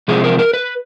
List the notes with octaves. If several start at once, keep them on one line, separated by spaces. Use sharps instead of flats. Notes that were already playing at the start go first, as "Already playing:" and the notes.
C3 F3 G#3 C4 E4 G#4
A#4
A#4
B4